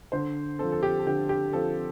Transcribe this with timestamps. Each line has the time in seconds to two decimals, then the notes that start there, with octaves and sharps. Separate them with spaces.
0.12 D3 C5
0.59 F3 C4 A4
0.72 A4
0.83 G4
0.99 A4
1.06 D3 G4
1.29 G4
1.53 F3 C4 A4